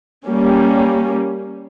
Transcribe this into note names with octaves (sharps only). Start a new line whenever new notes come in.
G3 A#3 C#4